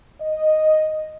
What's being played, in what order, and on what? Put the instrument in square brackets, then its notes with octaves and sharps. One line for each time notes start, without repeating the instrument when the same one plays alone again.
[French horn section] D#5